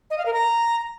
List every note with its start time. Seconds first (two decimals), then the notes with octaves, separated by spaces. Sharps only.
0.10 D#5
0.18 F5
0.26 A#4
0.33 A#5